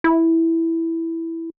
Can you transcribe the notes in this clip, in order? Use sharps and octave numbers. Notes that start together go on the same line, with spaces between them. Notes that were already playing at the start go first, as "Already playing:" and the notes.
E4